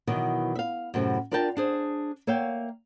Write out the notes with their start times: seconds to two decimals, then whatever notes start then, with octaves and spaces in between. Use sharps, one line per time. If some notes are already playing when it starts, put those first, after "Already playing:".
0.07 B2 D#3 E3 F#3
0.55 E5 F5
0.94 F#2 A2 C3
1.31 D4 F4 A#4 D5 G5 A5
1.57 D4 G#4 C5
2.27 A#3 C#5 E5 F5 G5